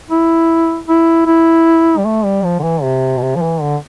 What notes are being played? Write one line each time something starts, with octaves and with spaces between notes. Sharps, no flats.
E4
E4
E4
G3
A3
G3
F3
D3
E3
C3
B2
C3
F3
E3
D3